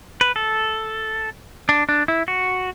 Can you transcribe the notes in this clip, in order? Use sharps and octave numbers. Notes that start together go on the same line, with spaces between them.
B4
A4
D4
D4
E4
F#4